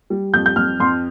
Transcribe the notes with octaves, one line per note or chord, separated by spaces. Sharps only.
G3
F2 G6
G6
F2 F6
F2 C6